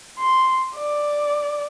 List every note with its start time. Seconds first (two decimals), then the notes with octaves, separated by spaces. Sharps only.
0.19 C6
0.76 D5